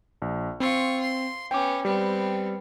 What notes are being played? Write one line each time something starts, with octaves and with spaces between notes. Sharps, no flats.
A#1
C4 F4 C#6
C6
B3 C#4 G5 D6
G3 B3 C4